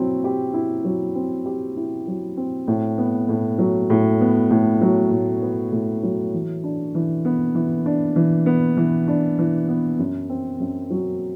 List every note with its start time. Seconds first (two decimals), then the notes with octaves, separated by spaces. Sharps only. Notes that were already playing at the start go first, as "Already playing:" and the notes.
Already playing: F#3 C4 E4
0.24 G4
0.54 E4
0.84 F#3
1.15 C4
1.46 G4
1.77 E4
2.07 F#3
2.37 C4
2.68 A2
2.98 B3
3.29 A2
3.58 F#3
3.90 A2
4.21 B3
4.51 A2
4.81 F#3
5.11 A2
5.42 B3
5.72 A2
6.03 F#3
6.34 E3
6.64 D4
6.95 E3
7.25 B3
7.55 E3
7.86 D4
8.16 E3
8.46 B3
8.77 E3
9.08 D4
9.39 E3
9.68 B3
9.99 F#2
10.29 C4
10.60 F#2
10.90 F#3